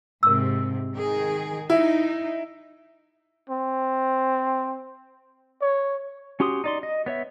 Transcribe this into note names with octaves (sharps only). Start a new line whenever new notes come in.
G#2 C3 A#4 C#6 E6
D#3 G#4
D#4 E4
C4
C#5
C#4 F#4 G4 C6 D#6
D#4 D5 C6
D#5
B3 C#5 E5